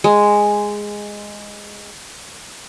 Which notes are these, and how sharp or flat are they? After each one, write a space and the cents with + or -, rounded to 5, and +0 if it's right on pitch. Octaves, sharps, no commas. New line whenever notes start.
G#3 -5